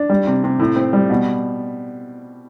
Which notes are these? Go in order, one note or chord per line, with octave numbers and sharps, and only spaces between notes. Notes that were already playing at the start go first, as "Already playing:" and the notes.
Already playing: D4
G3
C3
C3
A2
C4
G3
B2